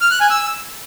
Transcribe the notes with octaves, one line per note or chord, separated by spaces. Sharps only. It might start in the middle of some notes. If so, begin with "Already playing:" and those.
F6
F#6
G#5
E6